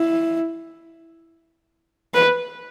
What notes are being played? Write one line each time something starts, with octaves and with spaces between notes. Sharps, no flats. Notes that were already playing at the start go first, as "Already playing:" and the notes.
Already playing: E4
B4